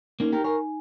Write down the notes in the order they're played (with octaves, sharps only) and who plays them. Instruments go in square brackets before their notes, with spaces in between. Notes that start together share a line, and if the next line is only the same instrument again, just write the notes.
[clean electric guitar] A#3 C#4 [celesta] D#4
[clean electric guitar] G4 A#4
[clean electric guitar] A#4 C#5 [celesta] G#5